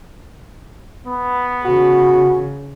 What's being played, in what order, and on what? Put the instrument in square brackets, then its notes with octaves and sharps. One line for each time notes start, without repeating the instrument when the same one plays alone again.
[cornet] B3
[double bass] C#3 [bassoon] F#4